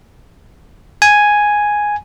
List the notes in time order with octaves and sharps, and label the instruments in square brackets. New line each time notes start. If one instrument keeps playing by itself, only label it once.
[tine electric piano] G#5